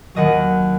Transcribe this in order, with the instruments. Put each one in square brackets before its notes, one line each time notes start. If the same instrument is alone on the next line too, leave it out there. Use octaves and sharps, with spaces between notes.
[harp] D#2 D#3 F#3 D#5 F#5